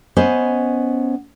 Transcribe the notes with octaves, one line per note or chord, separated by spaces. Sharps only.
B3 C#4 C5 D#5